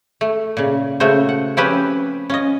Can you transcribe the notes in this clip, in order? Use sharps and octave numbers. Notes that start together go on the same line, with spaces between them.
A3
A#2 C#3
C#3 A3 F#4 C5
F#5
F3 C4 C#4 G4 B4 C5
C#4 F4 D#5